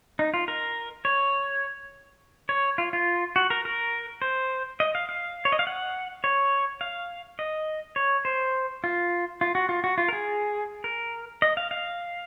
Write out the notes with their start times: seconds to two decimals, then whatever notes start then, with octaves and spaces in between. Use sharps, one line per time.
0.19 D#4
0.34 F4
0.48 A#4
1.05 C#5
2.49 C#5
2.78 F4
2.93 F4
3.36 F#4
3.50 A#4
3.65 A#4
4.22 C5
4.80 D#5
4.95 F5
5.09 F5
5.45 C#5
5.52 D#5
5.59 F5
5.67 F#5
6.24 C#5
6.81 F5
7.39 D#5
7.96 C#5
8.25 C5
8.84 F4
9.41 F4
9.55 F#4
9.69 F4
9.84 F#4
9.98 F4
10.08 A#4
10.13 G#4
10.84 A#4
11.42 D#5
11.57 F5
11.71 F5